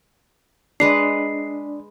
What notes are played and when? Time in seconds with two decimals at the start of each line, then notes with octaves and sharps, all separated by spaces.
0.80 G#3 D4 B4 D5 A#5 C7